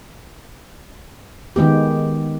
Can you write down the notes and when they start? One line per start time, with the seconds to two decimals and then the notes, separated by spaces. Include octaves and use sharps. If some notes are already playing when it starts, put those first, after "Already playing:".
1.56 D#3 G#3 B3 G4